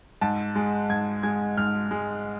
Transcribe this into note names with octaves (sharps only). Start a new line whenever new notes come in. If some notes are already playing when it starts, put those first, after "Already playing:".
G#2 A5
G#3
G#2 G#6
G#3 G#6
G#2 F6
G#3